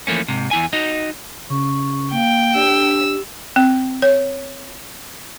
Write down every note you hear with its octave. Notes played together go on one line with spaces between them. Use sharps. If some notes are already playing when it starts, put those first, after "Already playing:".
E3 F3 A3 A#3 C#4
G#2 C3
E2 E4 G#5
D#4 F#4 D#5
C#3 C#4 C#6
A#3 F5 G5
D4 G4 E6
C4
C#5